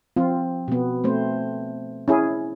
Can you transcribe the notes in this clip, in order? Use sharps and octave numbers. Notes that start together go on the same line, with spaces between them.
F3 C4 F4
B2 B3
A3 C4 C5
C#4 E4 G#4